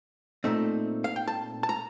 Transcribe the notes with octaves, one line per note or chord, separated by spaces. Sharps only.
A#2 A3 C4 D#4
F5
G5
A5
A5
A#5